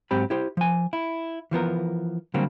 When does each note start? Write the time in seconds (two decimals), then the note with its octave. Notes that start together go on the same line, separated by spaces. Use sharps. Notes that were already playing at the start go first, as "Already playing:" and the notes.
0.11 G#2 F#3 C4 G4 B5
0.30 E4 G4 C5
0.57 F3 G#5
0.93 E4
1.51 E3 F3 B3 A#4
2.34 D3 F#3 G3 A#3 C4